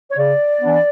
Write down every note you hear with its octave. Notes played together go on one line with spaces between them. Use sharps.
C#5
C#3 D5
E3 B3 D4